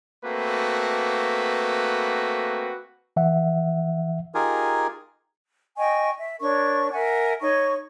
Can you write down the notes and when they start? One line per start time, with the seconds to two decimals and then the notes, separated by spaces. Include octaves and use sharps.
0.25 A3 A#3 C4 F#4 B4
3.16 E3 E5 F#5
4.35 D#4 F4 G4 G#4 A#4 G#5
5.77 D#5 G5 G#5 C#6
6.18 E5
6.40 D4 A#4 C#5 C#6
6.92 A#4 E5 F#5 G#5
7.42 D#4 C#5 C#6